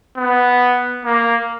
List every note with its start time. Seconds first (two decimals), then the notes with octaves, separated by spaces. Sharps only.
0.17 B3
1.05 A#3